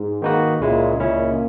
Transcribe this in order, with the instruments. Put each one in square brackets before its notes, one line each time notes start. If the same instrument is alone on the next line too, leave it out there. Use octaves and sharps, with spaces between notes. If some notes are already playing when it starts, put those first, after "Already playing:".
Already playing: [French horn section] G#2
[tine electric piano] D#3 A#3 D#4 F#4 B4
[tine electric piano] C#2 C#3 G#3 C#4 E4 [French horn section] A#2
[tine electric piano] C#2 C#3 G#3 C#4 E4 [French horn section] A#2